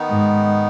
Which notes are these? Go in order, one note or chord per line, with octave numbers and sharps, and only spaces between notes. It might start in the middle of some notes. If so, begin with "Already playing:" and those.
Already playing: D#3 B3 D#4
G#2